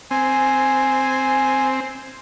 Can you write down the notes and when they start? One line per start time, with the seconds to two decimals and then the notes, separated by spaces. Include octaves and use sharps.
0.11 C4 G#5